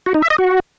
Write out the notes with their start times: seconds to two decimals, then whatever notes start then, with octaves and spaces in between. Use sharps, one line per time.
0.06 F#4
0.14 D#4
0.22 E5
0.30 D#5
0.38 F#4